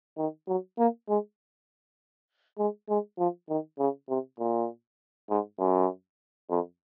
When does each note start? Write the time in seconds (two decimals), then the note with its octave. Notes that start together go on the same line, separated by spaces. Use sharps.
0.18 D#3
0.47 F#3
0.78 A#3
1.09 G#3
2.58 G#3
2.89 G#3
3.18 F3
3.49 D#3
3.79 C#3
4.09 C3
4.40 A#2
5.30 G#2
5.59 F#2
6.50 F2